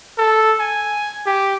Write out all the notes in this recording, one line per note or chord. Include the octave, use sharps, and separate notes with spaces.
A4
G#5
G4